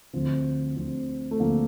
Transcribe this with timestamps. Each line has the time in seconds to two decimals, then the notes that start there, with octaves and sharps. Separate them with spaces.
0.13 D2 D3 F3 C4
0.76 D2 D3 F3 C4
1.31 A3
1.40 D2 D3 F3 A#3